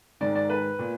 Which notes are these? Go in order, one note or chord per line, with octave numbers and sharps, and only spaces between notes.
G#2 D#3 G#3 D5
D5
B4
A#2